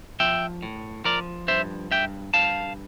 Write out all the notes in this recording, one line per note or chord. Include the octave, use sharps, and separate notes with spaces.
F3 E5 G5
A2
F3 A#4 D5
G2 C5 E5
G2 E5 G5
G2 F5 A5